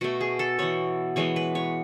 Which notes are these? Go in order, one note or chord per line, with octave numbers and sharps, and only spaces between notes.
B2 A3 F#4
G#4
A4
E3 B3 C#5
E3 G#3 B3 C#5
B4
C#5